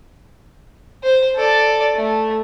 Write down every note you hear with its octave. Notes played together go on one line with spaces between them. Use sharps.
C5
A4 D5
A3